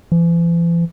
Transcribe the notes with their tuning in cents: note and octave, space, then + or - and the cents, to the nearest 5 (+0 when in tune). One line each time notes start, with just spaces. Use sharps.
E3 +45